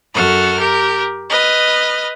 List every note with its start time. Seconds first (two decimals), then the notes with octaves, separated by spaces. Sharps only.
0.14 F#2 F#4 A4 F6
0.58 G4 A#4
1.30 B4 D#5 F6